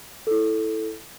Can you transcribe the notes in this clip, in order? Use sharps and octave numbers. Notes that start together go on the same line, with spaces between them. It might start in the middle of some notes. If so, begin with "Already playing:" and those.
E4 A4